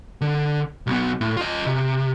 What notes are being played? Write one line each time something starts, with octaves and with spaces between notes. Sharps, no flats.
D3
B1 B3
A2
F4 D#5
C3